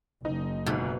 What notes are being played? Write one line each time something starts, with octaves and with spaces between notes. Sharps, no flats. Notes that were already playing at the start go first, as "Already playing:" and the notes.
F#1 D#4
G1 D2 G#2 B2